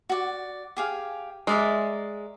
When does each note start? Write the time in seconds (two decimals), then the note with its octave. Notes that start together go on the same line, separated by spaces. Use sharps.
0.09 F#4 D5
0.77 G4 G#4 F5
1.47 G#3 A#4 D5 E5